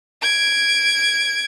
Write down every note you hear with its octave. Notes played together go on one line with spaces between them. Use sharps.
G#6 D7